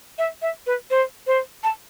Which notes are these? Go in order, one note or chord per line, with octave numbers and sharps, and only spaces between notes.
E5
E5
B4
C5
C5
A5